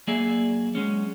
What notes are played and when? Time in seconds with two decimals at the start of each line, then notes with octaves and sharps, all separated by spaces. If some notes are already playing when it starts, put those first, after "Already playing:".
0.07 F#3 A#3 G#4 D5 E5
0.75 F#3 G#3 C#4